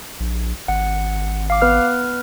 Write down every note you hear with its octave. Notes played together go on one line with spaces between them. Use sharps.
A#1
G#1 F#5
F5 D6
B3 B4 F6